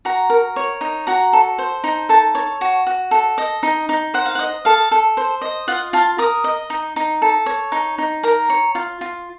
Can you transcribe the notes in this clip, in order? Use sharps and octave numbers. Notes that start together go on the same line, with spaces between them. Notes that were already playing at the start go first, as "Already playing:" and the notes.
F#4 A#5
A#4
C#5
D#4
F#4 A#5
A4
C5
D#4
A4 A5
C#5
F#4
F#4
A4
D#5
D#4
D#4
C5 F#5
F5
F#5
D#5
A4 F5
A4
C5
D#5
F4 F#5
F4 A5
A#4 D#6
D#5
D#4
D#4
A4
C#5
D#4
D#4
A#4 A#5
C#5
F4
F4